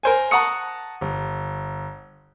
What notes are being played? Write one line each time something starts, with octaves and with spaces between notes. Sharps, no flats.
A#4 C5 G#5
F#5 A5 A#5 C#6 D#6 C#7
G1